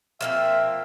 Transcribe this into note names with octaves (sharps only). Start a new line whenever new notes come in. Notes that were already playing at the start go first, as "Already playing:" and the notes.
F3 A#3 C4 E5